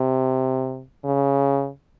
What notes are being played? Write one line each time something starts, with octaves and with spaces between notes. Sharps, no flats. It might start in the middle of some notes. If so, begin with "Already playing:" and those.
Already playing: C3
C#3